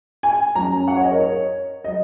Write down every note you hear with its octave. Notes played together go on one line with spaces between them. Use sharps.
G#5
F#2 F#3 A#5
F#5
C#5
D#5
A#4
C#5
F#3 D#5